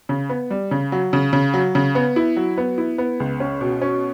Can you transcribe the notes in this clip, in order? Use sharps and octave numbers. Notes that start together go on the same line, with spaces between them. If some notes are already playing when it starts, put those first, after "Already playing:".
C#3
B3
G3
C#3
F#3
C#3
C#3
F#3
C#3
B3
E4
F#3
B3
E4
B3
C#2
C#4
B2
C#4